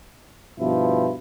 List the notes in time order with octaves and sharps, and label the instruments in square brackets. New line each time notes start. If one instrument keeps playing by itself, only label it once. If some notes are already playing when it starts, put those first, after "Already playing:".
[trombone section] G2 B2 F3 E4